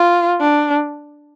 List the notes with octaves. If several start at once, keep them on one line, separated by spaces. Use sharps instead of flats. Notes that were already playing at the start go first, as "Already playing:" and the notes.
Already playing: F4
D4